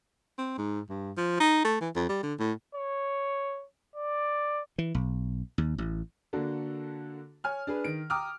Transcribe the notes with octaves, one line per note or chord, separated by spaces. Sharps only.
C4
G#2
G2
F3
D#4
A3
E3
F2
G3
D3
A2
C#5
D5
E3
B1
D#2
A1
D3 A#3 D4 F#4 A4
C#5 G#5 F6
D4 G#4 B4
D#3 D7
G5 A#5 D6 D#6 F6